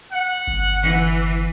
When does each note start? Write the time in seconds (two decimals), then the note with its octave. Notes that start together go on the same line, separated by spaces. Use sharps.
0.12 F#5
0.47 G1
0.82 E3